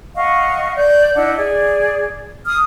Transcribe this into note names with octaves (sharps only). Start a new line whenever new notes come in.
D#5 F5 F#5 C#6
D5 G6
D4 E4 D#5 F#5
G#4 D5
D#6 F6